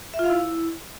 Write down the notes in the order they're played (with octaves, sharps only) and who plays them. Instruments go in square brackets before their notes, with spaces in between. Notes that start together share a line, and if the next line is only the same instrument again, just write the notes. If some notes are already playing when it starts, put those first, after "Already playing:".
[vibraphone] E5
F4
F5
E4